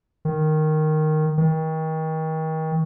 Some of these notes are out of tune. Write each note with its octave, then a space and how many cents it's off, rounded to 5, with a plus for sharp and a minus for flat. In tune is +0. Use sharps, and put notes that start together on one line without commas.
D#3 -5
D#3 +35